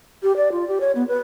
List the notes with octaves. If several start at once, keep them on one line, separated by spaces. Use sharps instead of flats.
G4
D5
F4
G4
C#5
B3
B4